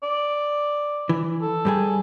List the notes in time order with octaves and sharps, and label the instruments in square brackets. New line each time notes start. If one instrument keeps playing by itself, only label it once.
[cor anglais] D5
[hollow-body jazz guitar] E3
[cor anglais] A4
[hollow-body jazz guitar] G2 G3 G#4